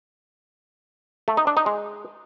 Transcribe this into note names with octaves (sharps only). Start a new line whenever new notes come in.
A3
D#4
D4
D#4
G#3